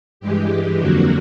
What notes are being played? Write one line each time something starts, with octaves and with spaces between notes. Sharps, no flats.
G2 E3 G#3 G4
F2 D3 F#3 A#3 F#4